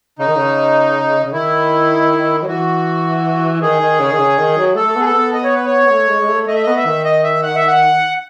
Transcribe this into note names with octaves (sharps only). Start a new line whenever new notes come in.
C#3 D#4
D#3
C#3
C#3
D#3 E4
F#3
E3 F#4
D#3 G#4
D#3
C#3
D#3
C#3
D#3
F#3
A3 A4
A3
B3 G#4
A4
B3
D#5
C#5
B4
C#5
B3
A3
G#3
G#3
A3
A3 D#5
E5
B3 D#5
E5
D#3
D#5
E5
F#5
E5
F#5